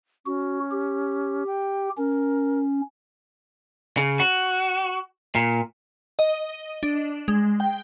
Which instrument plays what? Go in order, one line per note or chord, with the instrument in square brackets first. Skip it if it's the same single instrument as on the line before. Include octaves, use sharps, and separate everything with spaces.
[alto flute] C#4 [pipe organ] F#4
[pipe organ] G4
[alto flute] G5
[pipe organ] C#4 [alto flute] A#4
[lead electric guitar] C#3
F#4
A#2
[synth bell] D#5
D4
G#3
G5